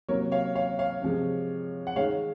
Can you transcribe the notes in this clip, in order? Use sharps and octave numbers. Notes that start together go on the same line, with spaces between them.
C3 F#3 A#3 A#4 C#5
C#5 F5
C#5 F5
C#5 F5
C3 F3 G#3
F#5
D#3 G#3 C#5 F5